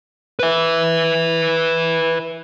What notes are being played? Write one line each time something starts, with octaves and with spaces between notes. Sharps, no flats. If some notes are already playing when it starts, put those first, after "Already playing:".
B4 E5